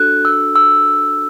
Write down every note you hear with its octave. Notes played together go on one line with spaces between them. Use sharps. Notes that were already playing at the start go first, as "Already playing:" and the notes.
Already playing: D4 F#4 A4 F#6
E6
E6